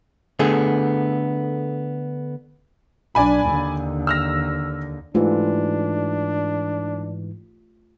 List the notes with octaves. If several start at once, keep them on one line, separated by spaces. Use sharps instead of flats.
D3 A3 B3 G#4
B1 D4 D5 G#5 B5
D#2 D3
E6 F6 A#6
G#2 E3 A3 D4 F4 G4